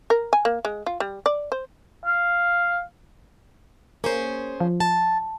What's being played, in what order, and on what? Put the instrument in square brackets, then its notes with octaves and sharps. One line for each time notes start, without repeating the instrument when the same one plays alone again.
[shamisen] A#4
G#5
A#3
G#3
F4
G3
D5
C5
[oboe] F5
[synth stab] A#3 [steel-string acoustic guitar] C#4 G#4 C5
[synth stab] F3
[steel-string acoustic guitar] A5